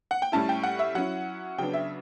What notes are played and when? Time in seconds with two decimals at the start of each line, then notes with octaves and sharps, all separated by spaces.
0.11 F#5
0.22 G5
0.32 A2 G3 C#4 E4 A5
0.49 G5
0.63 F#5
0.79 E5
0.95 F#3 C#4 E4 F#5
1.58 C#3 F#3 B3 D4 G5
1.74 E5